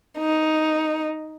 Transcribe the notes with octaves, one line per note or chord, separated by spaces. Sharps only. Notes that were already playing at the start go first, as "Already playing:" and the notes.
D#4